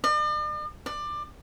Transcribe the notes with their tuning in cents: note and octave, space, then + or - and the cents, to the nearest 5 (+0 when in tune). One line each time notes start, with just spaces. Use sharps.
D5 +45
D5 +20